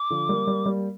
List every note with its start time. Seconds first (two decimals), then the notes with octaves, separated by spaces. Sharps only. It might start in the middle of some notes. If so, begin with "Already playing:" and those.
Already playing: D6
0.10 D3 F3
0.29 G3 A#3
0.47 G3 A#3
0.66 G3 A#3